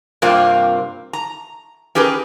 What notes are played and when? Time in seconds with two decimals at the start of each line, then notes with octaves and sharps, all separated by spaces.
0.22 G2 C3 A#3 C4 F4
1.13 A#5
1.95 C#4 G4 G#4 A#4 B4